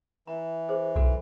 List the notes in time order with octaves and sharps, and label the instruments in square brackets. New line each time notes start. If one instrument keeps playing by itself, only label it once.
[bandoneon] E3 [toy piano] A#5
[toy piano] G#4 C5
[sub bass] B1 [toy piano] F#4 A4 B4